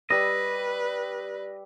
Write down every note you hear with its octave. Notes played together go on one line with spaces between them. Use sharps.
G3 B4 D#5 E6